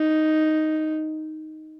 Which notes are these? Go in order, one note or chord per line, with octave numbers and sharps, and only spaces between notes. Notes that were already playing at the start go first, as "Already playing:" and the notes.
Already playing: D#4